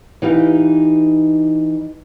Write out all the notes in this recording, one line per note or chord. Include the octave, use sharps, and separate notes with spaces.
E3 D#4 G4 F5